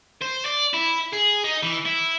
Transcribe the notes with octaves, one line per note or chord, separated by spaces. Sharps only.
C5
D5
E4
G#4
D#4
E3
E4